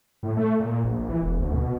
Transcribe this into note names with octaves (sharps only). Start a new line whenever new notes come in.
A2
A3
A#2
A#1
E3
E1
D2
B2